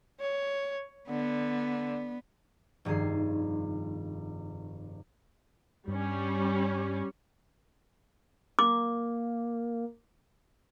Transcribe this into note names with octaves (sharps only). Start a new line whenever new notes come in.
C#5
D3 B3
F1 G2 D#3 G#4 C7
G2 G3 C#4
A#3 D6